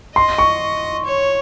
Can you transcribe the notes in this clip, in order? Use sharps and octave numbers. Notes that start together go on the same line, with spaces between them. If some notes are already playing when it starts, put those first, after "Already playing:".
D#5 C6
C#6
C#5